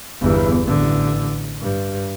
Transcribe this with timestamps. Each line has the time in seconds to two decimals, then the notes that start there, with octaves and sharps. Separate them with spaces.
0.20 G1 E2
0.65 A1 D3
1.61 G2